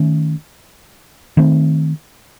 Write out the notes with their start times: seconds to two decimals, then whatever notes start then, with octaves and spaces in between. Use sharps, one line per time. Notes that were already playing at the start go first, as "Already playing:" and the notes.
Already playing: D#3 A3 C#4
1.37 D#3 A3 C4